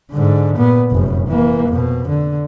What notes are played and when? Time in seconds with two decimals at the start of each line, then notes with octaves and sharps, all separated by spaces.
0.12 G#2 D3
0.57 A#2 B3
0.92 F1 F#2
1.28 E3 A#3
1.69 F2 B2
2.08 D3